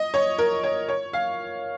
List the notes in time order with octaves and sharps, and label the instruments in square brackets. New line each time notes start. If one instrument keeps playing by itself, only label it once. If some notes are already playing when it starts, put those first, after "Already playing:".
Already playing: [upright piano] D#5
C#5
A#4
C#5
C#5
F5